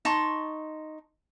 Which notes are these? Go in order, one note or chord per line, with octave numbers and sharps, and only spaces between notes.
D#4 A5 C6 C#6